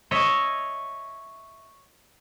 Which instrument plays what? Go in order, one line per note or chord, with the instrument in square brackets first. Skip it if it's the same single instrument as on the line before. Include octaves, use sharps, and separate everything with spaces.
[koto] C#5 D#5 E5